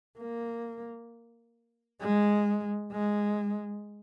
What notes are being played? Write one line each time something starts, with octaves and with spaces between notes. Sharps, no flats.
A#3
G#3
G#3